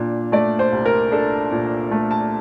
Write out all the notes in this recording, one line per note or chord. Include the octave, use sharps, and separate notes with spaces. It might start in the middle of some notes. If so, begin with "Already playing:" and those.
Already playing: A#2 D4
A3 D5
C5
C2
A#4
D4 A4
A#2
A3
A5